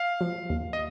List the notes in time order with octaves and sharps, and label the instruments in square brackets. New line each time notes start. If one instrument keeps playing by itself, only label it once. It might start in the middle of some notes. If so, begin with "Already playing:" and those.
Already playing: [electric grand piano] F5
[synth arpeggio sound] F3
D#2
[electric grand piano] D#5